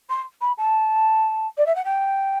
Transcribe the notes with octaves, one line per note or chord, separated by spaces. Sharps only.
C6
B5
A5
D5
E5
F#5
G5